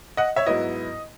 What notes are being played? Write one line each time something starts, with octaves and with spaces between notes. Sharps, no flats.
D#5 F#5
C#5 E5
G#2 F#3 B3 E4 D#5